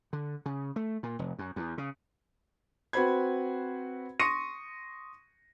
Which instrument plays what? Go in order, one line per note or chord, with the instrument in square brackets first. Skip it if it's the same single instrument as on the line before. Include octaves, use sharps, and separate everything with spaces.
[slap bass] D3
C#3
A3
A#2
F1
F#2
E2
C#3
[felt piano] C4 F#4 B4 C5 B5 G#6
C6 C#6 D#6 A#6 C#7 D#7